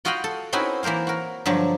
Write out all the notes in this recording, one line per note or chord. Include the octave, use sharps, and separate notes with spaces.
F4 F#4 D#5 F5 G5 B5
A4
C4 C#4 D#4 E4 F#4 B4
E3 A#3 A#4 C5 F5
F#4 A#4
G2 D3 F3 F#3